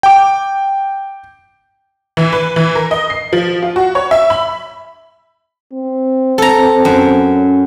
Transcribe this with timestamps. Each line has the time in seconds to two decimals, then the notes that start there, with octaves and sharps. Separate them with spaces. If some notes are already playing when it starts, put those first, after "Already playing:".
0.03 G5 D6
2.17 E3
2.33 B4
2.56 E3
2.75 A#4
2.91 D#5
3.10 C7
3.33 F3
3.63 F4
3.76 F#4
3.95 C#5
4.11 E5
4.30 B5
5.74 C4
6.38 A4 A#5
6.85 F#2
7.35 C#4